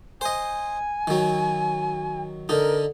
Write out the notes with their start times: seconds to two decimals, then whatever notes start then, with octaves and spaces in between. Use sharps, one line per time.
0.21 C5 D#5 G#5
1.07 D#3 F#3
2.49 D3 D#4 A#4